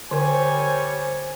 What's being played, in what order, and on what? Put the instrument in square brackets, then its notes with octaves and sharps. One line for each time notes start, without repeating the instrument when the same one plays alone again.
[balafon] D3 A#4 [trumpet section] G3 C#5 G#5 [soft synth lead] C5